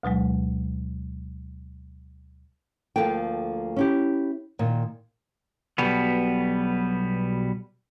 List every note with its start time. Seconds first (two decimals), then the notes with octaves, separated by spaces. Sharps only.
0.03 D2 B2 F#3 G#3
2.96 D2 F3 A#3 A4 G5
3.76 C#4 E4 G4
4.59 A#2 D#3
5.78 B1 B2 G3 B3